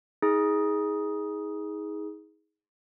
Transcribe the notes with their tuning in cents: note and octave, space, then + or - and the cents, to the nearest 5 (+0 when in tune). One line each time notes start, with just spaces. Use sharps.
D#4 +35 G#4 +0